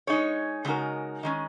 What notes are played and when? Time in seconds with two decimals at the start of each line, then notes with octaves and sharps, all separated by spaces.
0.07 G#3 D#4 G#4 C#5
0.65 C#3 G#3 D#4 F#4 A#4
1.23 D#3 G#3 C#4